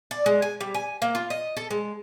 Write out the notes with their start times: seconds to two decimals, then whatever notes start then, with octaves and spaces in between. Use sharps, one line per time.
0.11 D5
0.26 G#3
0.42 G#5
0.61 G3
0.74 G#5
1.02 A#3
1.15 F4
1.30 D#5
1.57 A4
1.71 G#3